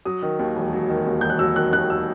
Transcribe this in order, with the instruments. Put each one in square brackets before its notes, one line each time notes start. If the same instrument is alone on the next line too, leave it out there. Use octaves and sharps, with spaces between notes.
[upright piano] F#3 D#6
D#3
D#2
E1
F#3
D#3
D#2
E1 G6
F#6
F#3 E6
D#3 F#6
D#2 F#6
E6